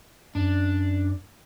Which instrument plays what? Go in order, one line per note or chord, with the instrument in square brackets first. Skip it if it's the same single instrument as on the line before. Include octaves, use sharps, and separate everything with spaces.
[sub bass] F#2 [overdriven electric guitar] D4